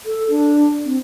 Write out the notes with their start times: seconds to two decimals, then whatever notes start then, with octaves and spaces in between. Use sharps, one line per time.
0.06 A4
0.30 D4
0.85 C4